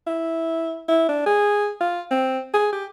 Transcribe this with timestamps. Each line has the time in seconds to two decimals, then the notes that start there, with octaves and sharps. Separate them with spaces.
0.07 E4
0.88 E4
1.09 D4
1.26 G#4
1.80 F4
2.11 C4
2.54 G#4
2.72 G4